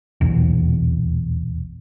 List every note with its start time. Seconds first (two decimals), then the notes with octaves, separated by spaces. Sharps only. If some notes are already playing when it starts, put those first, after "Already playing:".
0.21 D#1 B1 E2